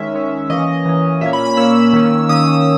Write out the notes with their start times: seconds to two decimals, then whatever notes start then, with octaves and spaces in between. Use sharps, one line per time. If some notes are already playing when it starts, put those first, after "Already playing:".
Already playing: D#3 G#3 C#4 E5
0.14 D#3 G#3 C#4
0.50 E3 A#3 C#4 D#5
0.85 E3 A#3 C#4
1.21 A#2 A#3 C#4 E5
1.33 B5
1.45 B5
1.57 A#2 A#3 C#4 E6
1.93 D#3 A#3 C#4
2.29 D#3 A#3 C#4 D#6